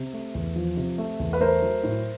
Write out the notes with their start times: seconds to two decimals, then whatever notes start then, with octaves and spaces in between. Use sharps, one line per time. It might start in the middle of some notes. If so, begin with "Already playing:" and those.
Already playing: C3
0.13 A3
0.35 E2
0.56 F3
0.77 C3
0.98 A3
1.19 E2
1.33 B4
1.41 A3 A#4 C5
1.62 F#3
1.83 A2